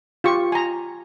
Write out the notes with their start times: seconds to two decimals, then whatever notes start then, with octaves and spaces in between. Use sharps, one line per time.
0.24 F4 G4 C#6
0.52 G#5 A#5